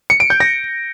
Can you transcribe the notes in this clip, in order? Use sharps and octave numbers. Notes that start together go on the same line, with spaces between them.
C#7
D7
G6
A#6